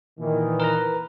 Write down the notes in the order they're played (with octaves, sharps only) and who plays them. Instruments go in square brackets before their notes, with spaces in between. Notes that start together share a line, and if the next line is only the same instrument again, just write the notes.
[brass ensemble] A#2 D#3 E3
[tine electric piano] A#4 B4 A#5